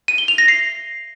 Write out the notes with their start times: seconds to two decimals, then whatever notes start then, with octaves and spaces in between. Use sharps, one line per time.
0.08 D#7
0.18 G7
0.28 F7
0.38 A#6
0.48 C7